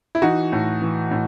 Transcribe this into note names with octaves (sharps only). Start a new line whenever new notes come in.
E4
E3 D#4 F#4
A2
E3
A2